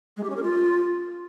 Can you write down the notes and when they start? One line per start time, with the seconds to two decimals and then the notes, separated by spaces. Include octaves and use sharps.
0.17 G#3
0.23 G4
0.30 C#4
0.36 A#4
0.43 F4